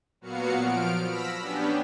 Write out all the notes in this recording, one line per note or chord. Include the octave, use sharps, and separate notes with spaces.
A#2 F#3 B3 F#4 F5 C#7
F3 F6 D7
B5 E6 A#6 B6
B3 C#4 D4 G4